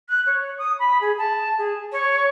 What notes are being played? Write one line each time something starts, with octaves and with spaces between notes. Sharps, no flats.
F#6
C#5
D#6
B5
G#4
A5
G#4
C#5